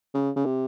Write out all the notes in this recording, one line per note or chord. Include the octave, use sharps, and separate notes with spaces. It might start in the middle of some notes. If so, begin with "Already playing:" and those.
C#3
C#3
C3